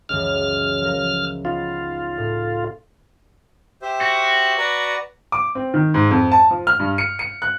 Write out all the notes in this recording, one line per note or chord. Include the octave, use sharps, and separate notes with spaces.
C#2 F#2 E3 F6
F3 A#4
B3 D#4 F4
A2
G4 C5 E5
F#4
B4 D5 A#5
D6
C4
D#3
G#2
F2
A5
F3
F6
G2
C#7
C#7
F#6